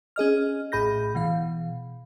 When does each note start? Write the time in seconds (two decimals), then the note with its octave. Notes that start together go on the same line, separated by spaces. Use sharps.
0.16 C#4 G#4 D#5 F6
0.72 A#1 A2 G#4 B5 G6 A#6
1.15 B2 E3 F5